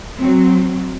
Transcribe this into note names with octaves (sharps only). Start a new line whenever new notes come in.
F#3 C4